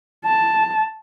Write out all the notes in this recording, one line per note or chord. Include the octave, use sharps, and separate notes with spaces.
A5